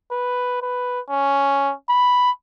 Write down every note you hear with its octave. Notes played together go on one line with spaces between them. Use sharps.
B4
B4
C#4
B5